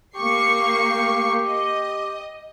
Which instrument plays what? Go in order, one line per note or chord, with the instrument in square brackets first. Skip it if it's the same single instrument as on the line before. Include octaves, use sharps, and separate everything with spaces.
[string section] A#3 C#6 C7 [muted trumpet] G4
[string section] D#5